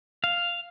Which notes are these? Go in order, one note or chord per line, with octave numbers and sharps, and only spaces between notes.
F5